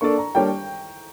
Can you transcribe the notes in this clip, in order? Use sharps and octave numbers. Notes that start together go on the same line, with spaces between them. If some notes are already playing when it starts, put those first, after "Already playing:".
A#3 D4 A4 D5 C#6
A#5
G3 A#3 D4 G4 C#5 G5